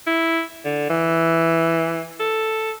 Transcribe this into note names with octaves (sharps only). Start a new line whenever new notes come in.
E4
D3
E3
A4